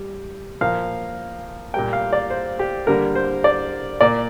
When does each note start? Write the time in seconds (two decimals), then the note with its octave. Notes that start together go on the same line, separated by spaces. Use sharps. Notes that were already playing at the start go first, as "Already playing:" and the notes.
Already playing: G3
0.61 A#2 F3 A#3 F5
1.74 A#2 G3 A#3 G5
1.93 F5
2.13 D5
2.30 C5
2.59 G4
2.87 D3 G3 A#3 A#4
3.15 C5
3.44 D5
4.01 A#2 A#3 D5